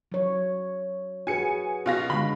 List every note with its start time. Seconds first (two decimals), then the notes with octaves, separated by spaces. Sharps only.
0.12 F#3 C#5
1.27 F#4 G#4 B4 G#5 C#7
1.86 B2 F4 A#6
2.10 D3 G#3 B5